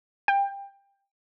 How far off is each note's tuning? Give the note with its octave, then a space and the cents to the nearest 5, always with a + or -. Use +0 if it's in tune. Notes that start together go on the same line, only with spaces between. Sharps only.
G5 +20